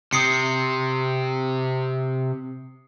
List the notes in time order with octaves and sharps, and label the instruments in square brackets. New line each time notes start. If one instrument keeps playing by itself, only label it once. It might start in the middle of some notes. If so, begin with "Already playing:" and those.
[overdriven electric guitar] C3 [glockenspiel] D#6 C7 C#7